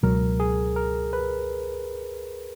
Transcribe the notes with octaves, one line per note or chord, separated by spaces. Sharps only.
C#2 B2 F#3 A#4
G#4
A#4
B4